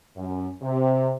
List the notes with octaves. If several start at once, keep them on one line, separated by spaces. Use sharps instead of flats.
F#2
C3